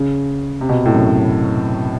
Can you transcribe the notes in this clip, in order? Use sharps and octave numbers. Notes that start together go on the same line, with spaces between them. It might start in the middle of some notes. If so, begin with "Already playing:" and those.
Already playing: C#3
C3
B2
A2
F#2